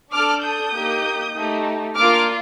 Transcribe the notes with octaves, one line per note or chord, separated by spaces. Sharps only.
D4 A4 D6 F6
D#6 G6
A#3 D#4 G4
A3 D#4 G4
A#3 D4 F4 D6 F6